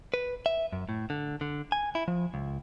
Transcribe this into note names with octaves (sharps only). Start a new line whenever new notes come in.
B4
E5
F#2
A2
D3
D3
G#5
E4
F3
C#2